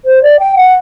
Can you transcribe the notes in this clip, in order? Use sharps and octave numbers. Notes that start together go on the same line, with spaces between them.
C5
D5
G5
F#5